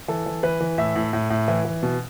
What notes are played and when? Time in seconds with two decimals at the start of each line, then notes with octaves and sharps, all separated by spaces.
0.08 E3 A4
0.26 E3
0.43 E3 B4
0.61 E3
0.78 A2 E5
0.96 A2
1.13 A2
1.30 A2
1.48 E3
1.65 E3
1.83 B2